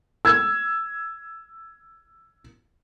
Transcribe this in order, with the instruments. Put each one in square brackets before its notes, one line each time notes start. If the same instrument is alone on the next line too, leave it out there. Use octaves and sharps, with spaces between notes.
[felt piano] E6 G#6